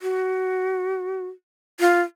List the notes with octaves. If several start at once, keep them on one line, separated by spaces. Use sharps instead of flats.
F#4
F4